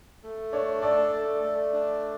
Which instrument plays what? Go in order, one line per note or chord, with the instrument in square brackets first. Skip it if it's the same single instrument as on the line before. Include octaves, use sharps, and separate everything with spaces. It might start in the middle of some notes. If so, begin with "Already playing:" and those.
[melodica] A3
[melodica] D4 [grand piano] C#5
[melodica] A4 [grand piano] D5
[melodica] A3
A3
D4